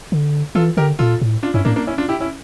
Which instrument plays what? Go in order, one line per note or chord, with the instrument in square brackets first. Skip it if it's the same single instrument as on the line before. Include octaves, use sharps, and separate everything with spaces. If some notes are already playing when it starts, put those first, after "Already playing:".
[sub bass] D3
[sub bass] E3 [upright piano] F4 A4
[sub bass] D3 [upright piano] G4 A#4
[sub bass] A#2 [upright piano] F4 A4
[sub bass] A2
[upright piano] D4 F4
[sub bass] G2 [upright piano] C#4 E4
[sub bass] A2 [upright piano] A#3 D4
[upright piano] A#3 D4
C#4 E4
D4 F4
E4 G4
C#4 E4